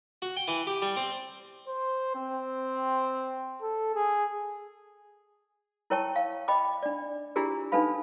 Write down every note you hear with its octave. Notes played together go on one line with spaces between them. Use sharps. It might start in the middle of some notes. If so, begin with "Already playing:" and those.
F#4
G5
E3
G4
G3
C4
C5
C4
A4
G#4
E4 A#4 C#5 G5 A5 C#6
F5
D#5 G5 B5 D6
D4 D5
D4 E4 F4 G4 G#4 A#4
D4 D#4 A4 B4 F5 B5